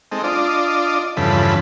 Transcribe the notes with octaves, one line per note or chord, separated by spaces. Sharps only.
G#3 C4 D#4 A4
D4 F4 D5 D#5
E2 G2 C#3 F3 A4 B5